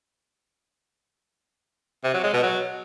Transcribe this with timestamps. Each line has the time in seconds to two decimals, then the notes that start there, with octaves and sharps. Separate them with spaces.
2.04 C3
2.14 F#3
2.23 G#3
2.33 B2
2.43 F#3